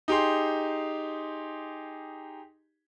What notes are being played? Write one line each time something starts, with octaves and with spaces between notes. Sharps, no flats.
D#4 G4 G#4 C6